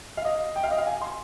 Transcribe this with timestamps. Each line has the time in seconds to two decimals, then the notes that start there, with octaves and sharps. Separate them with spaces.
0.17 F5
0.25 D#5
0.56 G5
0.64 F5
0.71 D#5
0.78 F5
0.87 G#5
1.01 C6